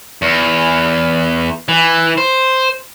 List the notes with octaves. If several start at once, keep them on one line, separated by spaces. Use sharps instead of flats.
E2
E3
C5